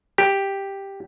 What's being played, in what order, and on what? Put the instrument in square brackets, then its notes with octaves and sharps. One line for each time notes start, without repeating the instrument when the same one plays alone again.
[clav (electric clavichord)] G4